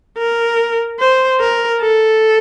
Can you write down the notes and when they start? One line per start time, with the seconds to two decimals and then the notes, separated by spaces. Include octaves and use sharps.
0.18 A#4
1.00 C5
1.40 A#4
1.81 A4